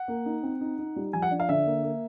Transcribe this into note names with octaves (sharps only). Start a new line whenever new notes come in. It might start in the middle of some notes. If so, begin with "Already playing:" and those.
Already playing: F#5
A#3
D#4
C4
D#4
D#4
G3
F3 G#5
F#5
D4
F5
D3 E5
A#3
A#3